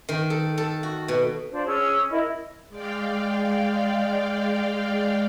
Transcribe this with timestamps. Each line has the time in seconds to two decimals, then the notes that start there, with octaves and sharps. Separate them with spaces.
0.09 D#3
0.30 A4
0.58 A4
0.83 F#4
1.08 B2
1.51 D4 F4 C5
1.66 C#4 G#4 E6
2.10 E4 A#4 D#5 B5
2.68 G#3 D5 F5 G5